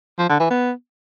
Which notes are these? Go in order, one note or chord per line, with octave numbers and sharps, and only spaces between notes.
F3
D3
E3
B3